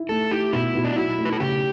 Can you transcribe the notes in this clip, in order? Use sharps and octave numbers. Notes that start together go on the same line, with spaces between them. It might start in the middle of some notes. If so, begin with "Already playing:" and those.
Already playing: E4
A3 A4
E4 G4
B2 E4
B2
D4
F#3 E4
A3
B4
A4
C#3 G4